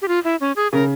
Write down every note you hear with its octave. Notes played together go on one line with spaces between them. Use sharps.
G4
F4
E4
C#4
G#4
C#3 A#4